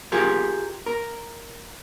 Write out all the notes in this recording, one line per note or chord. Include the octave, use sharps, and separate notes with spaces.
F4 G4 G#4 A#4
A#4